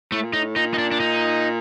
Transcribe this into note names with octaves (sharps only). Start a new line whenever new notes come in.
A2 A3
A#2
A2 D#4
A#2 D#4
D#4
D4
D4
D#4